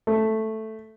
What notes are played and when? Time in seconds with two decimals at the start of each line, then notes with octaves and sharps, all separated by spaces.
0.07 A3